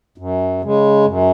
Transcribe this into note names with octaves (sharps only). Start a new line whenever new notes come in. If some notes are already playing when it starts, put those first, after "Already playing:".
F#2
C#3 G#3
F#2